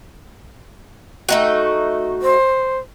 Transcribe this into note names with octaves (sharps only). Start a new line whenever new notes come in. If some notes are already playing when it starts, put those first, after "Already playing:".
A3 D#4 F#4
C5